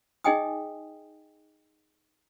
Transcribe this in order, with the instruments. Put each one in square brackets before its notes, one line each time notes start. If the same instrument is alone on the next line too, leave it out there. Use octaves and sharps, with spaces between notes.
[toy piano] D#4 G#4 D#5 G5 G#5 D#6